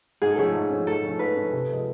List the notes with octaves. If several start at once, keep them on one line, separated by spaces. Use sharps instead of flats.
G#2 G#4
A4
F3 A3 C#4 G#4
G#2
F3 A3 C#4
G#2 A4
F3 A3 C#4
G#2 B4
F3 A3 C#4
C3
F3 G#3